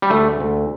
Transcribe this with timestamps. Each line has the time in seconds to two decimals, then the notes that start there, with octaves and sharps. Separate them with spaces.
0.02 G3
0.10 D2 A3
0.40 D2